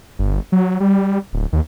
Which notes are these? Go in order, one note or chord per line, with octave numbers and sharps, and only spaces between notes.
G1
F#3
G3
D1
D#2